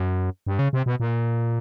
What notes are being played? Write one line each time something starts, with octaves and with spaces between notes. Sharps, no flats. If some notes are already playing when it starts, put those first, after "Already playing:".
Already playing: F#2
G2
C#3
C3
B2
A#2